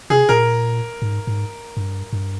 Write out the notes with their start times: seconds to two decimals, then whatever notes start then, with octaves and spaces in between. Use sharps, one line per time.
0.10 C3 G#4
0.29 A#2 A#4
1.02 G#2
1.27 G#2
1.77 G2
2.13 G2